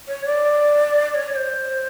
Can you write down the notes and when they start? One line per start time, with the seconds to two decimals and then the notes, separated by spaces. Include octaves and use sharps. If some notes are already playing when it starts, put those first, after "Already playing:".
0.08 C#5
0.26 D5
1.15 C#5
1.32 C#5
1.36 C5